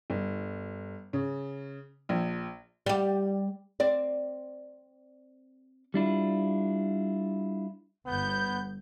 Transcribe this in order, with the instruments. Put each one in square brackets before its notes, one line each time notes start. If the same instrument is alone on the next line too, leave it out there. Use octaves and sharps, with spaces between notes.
[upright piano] G1
C#3
A#1
[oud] G3 G4
C4 D5
[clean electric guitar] G3 D4 E4 F4
[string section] G1 G6 [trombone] B3